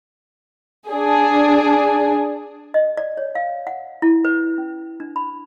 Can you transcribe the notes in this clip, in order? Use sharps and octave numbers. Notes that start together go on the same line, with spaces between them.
D4 G#4
D#5
D5
C#5
F5
F#5
E4
B4
C#4
D4
B5